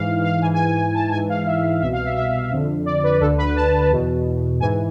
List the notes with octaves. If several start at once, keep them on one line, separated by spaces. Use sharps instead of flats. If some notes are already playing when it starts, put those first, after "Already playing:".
Already playing: G#2 E3 F5
F5
G#2 E3 G#5
G#5
G#5
G#5
A5
G#2 E3 G#5
F5
E5
C2 B2 E5
F5
E5
E5
F2 D3
D5
B4
D2 D3 A4
B4
A5
E2 B2
G#2 E3 G#5